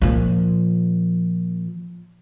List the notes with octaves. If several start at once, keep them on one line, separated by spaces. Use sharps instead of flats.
A#2 F3